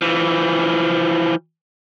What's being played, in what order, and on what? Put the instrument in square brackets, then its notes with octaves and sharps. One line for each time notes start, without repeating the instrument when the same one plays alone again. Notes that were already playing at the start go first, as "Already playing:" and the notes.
[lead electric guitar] E3 F3